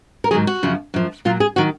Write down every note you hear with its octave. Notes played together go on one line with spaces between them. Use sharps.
A#4
G#2 D#3 F#3 G#4
F#4
F#2 C#3 F3
F#2 F3
A#2 F#3 F4
G#4
D#3 F#3 F#4